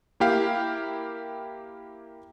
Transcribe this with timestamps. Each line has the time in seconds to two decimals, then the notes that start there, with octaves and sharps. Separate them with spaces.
0.20 A#3 E4 G4 F5